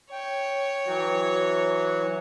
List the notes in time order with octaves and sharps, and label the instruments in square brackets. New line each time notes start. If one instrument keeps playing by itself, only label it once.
[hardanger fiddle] C#5 [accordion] G5
[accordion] E3 F#3 F#4